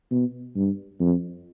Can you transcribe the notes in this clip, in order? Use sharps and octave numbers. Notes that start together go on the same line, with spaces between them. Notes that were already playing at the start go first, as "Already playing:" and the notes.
B2
G2
F2